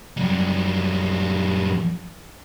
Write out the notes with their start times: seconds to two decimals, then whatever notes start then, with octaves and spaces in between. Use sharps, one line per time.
0.17 F#2 G3